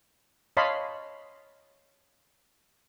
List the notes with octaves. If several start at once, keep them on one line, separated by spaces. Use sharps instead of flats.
C#5 D#5 F5 A5 B5 C6